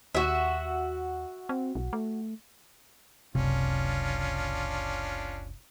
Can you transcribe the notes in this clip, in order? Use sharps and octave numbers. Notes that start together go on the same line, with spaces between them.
D#2 F#4 E5
C4
B1
A3
F#1 C#2 C3 C#4 D4 F4